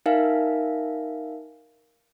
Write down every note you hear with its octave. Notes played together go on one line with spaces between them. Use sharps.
D#4 A#4 E5 F5 G#5